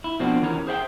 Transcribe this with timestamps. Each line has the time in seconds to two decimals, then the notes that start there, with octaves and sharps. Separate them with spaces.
0.04 E4
0.19 B2 F3 A#3 C4 D4 F#4
0.42 D#2 E3 C#4 A#4
0.67 G#4 C5 E5 F#5 G5